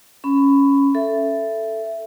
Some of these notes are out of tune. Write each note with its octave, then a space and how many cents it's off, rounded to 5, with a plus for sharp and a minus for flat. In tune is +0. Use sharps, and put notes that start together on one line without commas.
C#4 +0 B5 +15
A4 +0 E5 +15